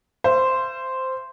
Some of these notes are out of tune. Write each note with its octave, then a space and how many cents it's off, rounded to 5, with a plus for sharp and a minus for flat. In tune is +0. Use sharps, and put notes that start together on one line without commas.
C5 -5 E5 +40